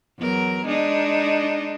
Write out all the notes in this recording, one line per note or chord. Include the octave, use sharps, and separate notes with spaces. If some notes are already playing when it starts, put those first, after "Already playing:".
E2 F#3 A#4
G#3 D4 D#4